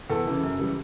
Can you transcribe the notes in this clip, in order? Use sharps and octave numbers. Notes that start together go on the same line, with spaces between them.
E2 A4
C#3 E3
F#2
C#3 E3 G3